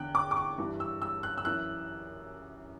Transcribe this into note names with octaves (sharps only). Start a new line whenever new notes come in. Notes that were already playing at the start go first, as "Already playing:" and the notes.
Already playing: E2 D3 G5 F#6
D6
D6
C#6
G2 E3
E6
E6
F#6
E6
F#2 E3 F#6